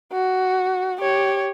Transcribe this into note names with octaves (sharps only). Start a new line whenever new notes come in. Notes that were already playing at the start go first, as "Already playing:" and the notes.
F#4
G4 C#5